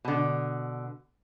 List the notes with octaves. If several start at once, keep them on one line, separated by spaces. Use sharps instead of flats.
B2 D3